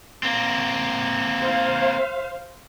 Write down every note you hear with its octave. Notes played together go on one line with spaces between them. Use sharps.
A#3 C4
C5 F5